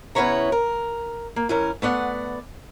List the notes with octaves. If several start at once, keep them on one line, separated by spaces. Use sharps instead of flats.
C#3 B3 C#4 E4 C#5 A#5
A#4
A#3
E3 C#4 A#4
A3 B3 D5 F#5